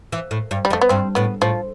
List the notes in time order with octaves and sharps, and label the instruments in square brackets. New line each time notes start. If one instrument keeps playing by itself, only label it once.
[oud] E3
A2
G2
[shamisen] G3
[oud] F2
[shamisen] A3
B3
[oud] G2 [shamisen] C4
[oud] A2 [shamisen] B3
[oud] A2 [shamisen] F3